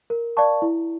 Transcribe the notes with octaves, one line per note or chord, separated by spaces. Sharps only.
A#4
D5 F5 A5 C#6
E4